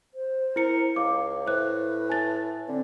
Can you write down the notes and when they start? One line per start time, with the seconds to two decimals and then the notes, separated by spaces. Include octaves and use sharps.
0.14 C5
0.56 E4 A#4 C#7
0.96 C#2 F5 D6
1.47 A2 B4 C5 F#6
2.09 G#5 A5 A6
2.68 D3 C4